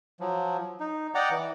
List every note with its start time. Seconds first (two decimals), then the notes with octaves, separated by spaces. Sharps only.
0.20 F3 F#3
0.80 D#4
1.15 D5 D#5 F#5 G5 A#5 D6
1.31 E3